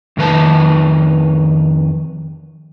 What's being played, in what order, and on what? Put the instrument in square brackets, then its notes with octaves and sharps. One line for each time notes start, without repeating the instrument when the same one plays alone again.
[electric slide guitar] F2 D#3 B4 A5